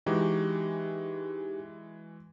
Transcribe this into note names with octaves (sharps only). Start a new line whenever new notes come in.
E3 G#3 D#4 F#4 G4